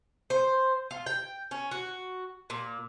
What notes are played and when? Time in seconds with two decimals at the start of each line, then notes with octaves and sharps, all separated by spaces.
0.30 C5
0.91 F4
1.06 G5
1.51 C#4
1.71 F#4
2.50 A#2